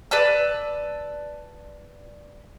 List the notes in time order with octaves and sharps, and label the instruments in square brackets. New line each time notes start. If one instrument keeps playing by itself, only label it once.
[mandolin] B4 D5 A5 E6